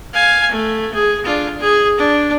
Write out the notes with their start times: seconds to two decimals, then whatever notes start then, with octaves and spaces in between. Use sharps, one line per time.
0.14 F5 G#5
0.51 A3
0.94 G#4
1.25 D4 F4
1.60 G#4
1.99 D4